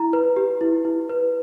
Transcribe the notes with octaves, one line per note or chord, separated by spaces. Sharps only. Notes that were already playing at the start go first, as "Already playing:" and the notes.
Already playing: E4 A#5
B4
G4
E4
E4
B4